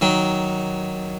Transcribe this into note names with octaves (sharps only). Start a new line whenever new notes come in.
D#3 F#3